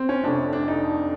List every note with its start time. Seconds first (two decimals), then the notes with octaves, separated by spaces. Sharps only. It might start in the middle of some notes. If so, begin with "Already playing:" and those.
Already playing: C4
0.09 C#4
0.23 F1 F2 C3 D4
0.53 D4
0.68 D#4